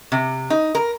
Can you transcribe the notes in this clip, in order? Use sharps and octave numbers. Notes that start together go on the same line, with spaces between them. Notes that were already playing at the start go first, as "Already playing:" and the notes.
C3
D#4
A#4